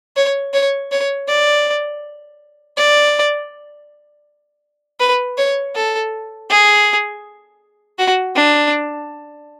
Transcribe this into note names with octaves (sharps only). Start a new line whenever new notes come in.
C#5
C#5
C#5
D5
D5
B4
C#5
A4
G#4
F#4
D4